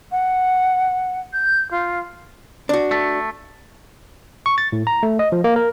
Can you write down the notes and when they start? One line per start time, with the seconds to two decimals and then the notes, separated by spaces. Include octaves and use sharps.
0.11 F#5
1.33 G6
1.71 F4
2.69 D4 F#4
2.91 A3
4.46 C#6
4.58 A6
4.72 A2
4.87 A#5
5.03 A3
5.19 D#5
5.32 F3
5.44 A#3
5.56 A#4